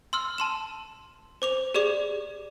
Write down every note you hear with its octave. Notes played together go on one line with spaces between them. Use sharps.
C6 E6 F6
A5 C6 E7
C5 D6 F7
G4 G#4 D5 D6 F7